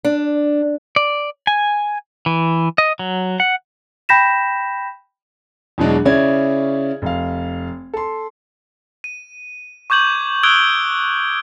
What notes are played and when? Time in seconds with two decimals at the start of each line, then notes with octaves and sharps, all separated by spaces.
0.05 D4
0.96 D5
1.47 G#5
2.26 E3
2.78 D#5
2.99 F#3
3.40 F#5
4.09 G5 B5 G6 A#6 B6 E7
5.78 E2 B2 E3 F#3 G#3 D4
6.05 C#3 C#4 E4 D5 G#6
7.02 F1 F5
7.94 A4 C6
9.04 D#7
9.90 C#6 D6 G6 G#6 F#7
10.43 D#6 E6 F#6 G#6 D7 G7